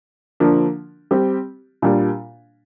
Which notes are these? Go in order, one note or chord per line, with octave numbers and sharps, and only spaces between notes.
D3 F3 A#3 D4
G3 C4 G4
A#2 G3 D4